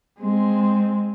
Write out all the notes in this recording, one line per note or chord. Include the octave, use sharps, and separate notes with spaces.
G#3 C4